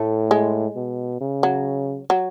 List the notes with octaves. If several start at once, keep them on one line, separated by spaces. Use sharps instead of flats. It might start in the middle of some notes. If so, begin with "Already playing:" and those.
Already playing: A2 A3
G#3
B2
C#3
F#3
F#3